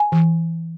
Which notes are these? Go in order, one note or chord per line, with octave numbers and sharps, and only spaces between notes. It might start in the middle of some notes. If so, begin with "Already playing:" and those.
Already playing: G#5
E3